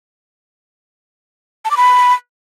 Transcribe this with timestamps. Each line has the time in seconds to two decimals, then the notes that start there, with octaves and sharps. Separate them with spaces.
1.65 A5
1.71 D6
1.77 B5